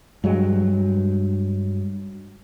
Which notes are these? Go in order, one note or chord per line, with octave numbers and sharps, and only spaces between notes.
G2 F#3 G#3